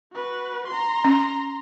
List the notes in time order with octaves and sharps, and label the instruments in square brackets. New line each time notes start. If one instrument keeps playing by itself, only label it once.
[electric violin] F#4 B4
A#5 C6
[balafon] C#4